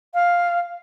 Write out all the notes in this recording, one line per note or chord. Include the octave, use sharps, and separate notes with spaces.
F5